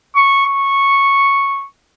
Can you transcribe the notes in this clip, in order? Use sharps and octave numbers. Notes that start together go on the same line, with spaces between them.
C#6
C#6